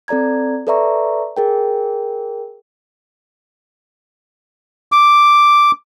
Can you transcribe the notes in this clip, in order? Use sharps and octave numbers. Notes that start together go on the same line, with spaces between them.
C4 A4 D5 A#5 G#6
A4 B4 D5 E5 A#5 C#6
G#4 A#4 G5
D6